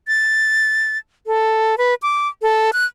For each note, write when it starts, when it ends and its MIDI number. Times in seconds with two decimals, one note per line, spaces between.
0.08 0.98 93
1.27 1.75 69
1.78 1.95 71
2.02 2.28 86
2.42 2.71 69
2.73 2.85 90